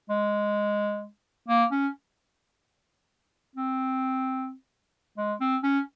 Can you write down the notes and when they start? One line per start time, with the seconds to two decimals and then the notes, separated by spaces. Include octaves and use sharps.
0.10 G#3
1.48 A#3
1.72 C#4
3.56 C4
5.17 G#3
5.41 C4
5.64 C#4